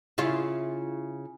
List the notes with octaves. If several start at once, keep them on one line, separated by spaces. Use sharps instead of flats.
C#3 E4 F4